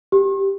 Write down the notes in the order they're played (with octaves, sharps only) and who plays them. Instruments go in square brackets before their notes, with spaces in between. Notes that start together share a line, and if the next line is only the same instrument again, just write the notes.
[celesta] G4